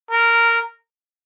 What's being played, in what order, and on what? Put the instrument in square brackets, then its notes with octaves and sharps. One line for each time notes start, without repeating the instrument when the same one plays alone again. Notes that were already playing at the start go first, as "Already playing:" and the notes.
[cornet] A#4